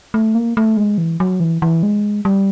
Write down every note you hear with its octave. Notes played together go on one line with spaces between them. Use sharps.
A3
A#3
A3
G#3
E3
F#3
E3
E3
G#3
G3